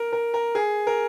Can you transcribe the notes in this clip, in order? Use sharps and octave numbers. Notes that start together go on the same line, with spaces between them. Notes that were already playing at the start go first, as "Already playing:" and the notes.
Already playing: A#4
A#4
A#4
G#4
A#4